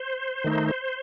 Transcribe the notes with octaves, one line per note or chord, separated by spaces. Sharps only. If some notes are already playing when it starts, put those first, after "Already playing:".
Already playing: C5
D#3 A3 D#4